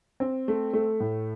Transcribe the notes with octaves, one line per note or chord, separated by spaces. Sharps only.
C4
A3
A3
A2